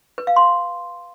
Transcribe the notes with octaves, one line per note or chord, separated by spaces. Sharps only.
B4
F5
C6